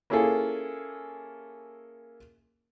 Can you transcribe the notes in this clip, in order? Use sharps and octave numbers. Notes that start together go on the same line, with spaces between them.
A#3 C#4 E4 F4 G#4 A4